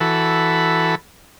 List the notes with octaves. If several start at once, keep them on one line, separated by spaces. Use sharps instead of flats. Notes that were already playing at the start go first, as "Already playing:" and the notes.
E3 F#4 A4 B5